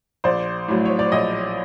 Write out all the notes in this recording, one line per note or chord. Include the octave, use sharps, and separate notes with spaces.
A#1 C5 D5
A2 F#3
C#5
D5
A#1 C#5 D#5